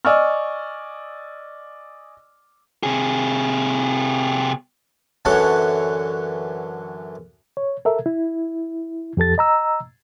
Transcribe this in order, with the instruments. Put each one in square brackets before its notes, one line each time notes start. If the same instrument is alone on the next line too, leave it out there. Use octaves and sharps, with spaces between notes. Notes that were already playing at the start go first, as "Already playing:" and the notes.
[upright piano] D5 D#5 G#5 C#6 E6 F6
[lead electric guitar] C3 G#4
[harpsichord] F#2 D3 E3 C#5 F#5 A5
[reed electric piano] C#5
A4 A#4 E5
E4
F2 G4 A4 A6
D#5 A#5 E6